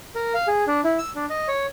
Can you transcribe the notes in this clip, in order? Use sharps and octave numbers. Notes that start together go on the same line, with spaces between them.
A#4
F5
G#4
D4
E4
E6
D4
D#5
C#5